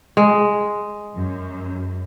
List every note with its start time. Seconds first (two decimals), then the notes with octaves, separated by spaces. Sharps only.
0.17 G#3
1.15 F#2